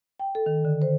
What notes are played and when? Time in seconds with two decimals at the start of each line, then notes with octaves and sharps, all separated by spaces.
0.20 G5
0.35 A4
0.46 D#3
0.65 D3
0.82 C5